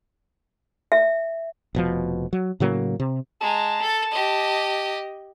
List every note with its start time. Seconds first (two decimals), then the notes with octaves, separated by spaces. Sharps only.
0.92 E5
1.75 F1 B2 F3
2.33 F#3
2.60 A2 C#3 F#3 A#3
3.00 C3
3.41 G#3 A5 A#5
3.82 A4
4.11 G4 D#5